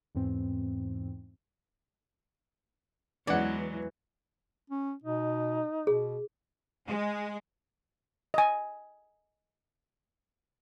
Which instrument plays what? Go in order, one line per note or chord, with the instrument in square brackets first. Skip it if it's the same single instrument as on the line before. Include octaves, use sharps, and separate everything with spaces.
[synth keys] E2 G#2 E3 C4
[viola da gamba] E2 F#3 G#3 [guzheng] E3 [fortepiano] D5 F#5
[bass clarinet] C#4
[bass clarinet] B2 [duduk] D#4
[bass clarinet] B2 [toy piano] G#4
[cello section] G#3
[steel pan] D#5 G#5